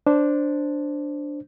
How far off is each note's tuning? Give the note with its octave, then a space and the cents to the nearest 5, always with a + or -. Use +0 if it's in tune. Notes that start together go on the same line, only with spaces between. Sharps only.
D4 +0 C5 +0